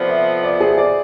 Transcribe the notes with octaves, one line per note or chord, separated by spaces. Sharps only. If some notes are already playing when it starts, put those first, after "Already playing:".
Already playing: F2 C3 F3 B3 C5 D5
E5
D5
G#4
D5